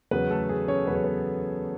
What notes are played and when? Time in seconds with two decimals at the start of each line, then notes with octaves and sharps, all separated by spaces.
0.11 E2 C#3 F#3 B3 B4
0.30 A3 A4
0.49 G#4
0.68 C#4 C#5
0.87 E2 C#3 F#3 B4
0.95 C#5
1.04 B3 B4